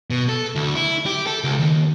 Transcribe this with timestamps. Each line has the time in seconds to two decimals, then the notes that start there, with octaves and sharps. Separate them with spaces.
0.10 B2
0.29 A4
0.56 D2
0.75 E4
1.06 G4
1.27 A4
1.44 C#2
1.59 D#2